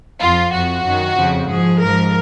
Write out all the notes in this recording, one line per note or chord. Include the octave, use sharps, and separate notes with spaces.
F2 F3 F4
F2 F3 F#4
F#2 D#3
F2 C#3 F3
G#2 F3 G#4
G#2 F3 A#4